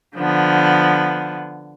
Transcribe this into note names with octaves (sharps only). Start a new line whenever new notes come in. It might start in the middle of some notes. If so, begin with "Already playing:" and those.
D3 F3 B3